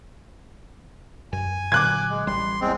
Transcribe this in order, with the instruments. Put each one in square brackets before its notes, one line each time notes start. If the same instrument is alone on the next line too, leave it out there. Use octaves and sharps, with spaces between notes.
[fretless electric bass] F#2 [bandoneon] G#5
[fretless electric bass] A#2 D3 F#3 [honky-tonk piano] D6 F#6 G#6
[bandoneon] G#3
[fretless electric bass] A1 G3 [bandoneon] C6
[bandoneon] E2 G#3 C4